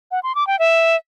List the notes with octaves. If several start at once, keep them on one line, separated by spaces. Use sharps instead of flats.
F#5
C6
D6
G5
E5